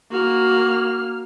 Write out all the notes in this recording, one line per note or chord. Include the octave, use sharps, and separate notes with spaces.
A#3 F#4 F6